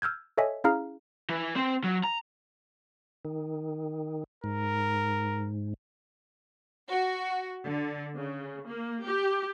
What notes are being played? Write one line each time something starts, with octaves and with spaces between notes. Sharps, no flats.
E6 F6 G6 G#6
A4 C#5 D#5 E5 G#5
C#4 E4 G#4 F5 A#5 F6
E3
C4 C5
F#3
A#5
D#3
G#2 A#4
F#4
D3
C#3
A#3
G4